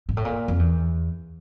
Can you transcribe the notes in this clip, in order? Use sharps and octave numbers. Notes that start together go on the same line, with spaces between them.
G#2
A2
A#2
F2
E2